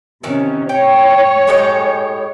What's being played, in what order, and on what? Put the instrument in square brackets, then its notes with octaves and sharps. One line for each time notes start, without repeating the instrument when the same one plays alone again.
[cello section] C3 C#4 [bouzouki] D#3 E3
[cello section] C#5 [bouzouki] G5
[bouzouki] A2 G#3 G4